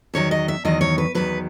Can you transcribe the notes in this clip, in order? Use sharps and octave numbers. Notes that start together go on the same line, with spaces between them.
E2 D#3 F#3 C#5
D#5
E5
E2 D#3 F#3 D#5
C#5
B4
E2 D#3 F#3 B4